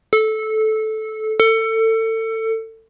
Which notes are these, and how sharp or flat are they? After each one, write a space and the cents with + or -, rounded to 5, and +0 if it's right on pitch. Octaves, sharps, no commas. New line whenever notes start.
A4 -15
A4 +25